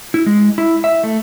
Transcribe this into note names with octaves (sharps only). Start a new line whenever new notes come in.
E4
G#3
E4
E5
A3